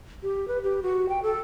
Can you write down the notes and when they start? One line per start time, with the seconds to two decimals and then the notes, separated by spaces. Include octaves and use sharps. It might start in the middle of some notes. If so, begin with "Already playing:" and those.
0.23 G4
0.48 B4
0.64 G4
0.83 F#4
1.09 G5
1.23 A4